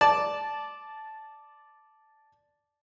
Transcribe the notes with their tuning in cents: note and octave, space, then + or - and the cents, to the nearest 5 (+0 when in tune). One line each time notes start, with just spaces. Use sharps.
D5 +0 A5 -10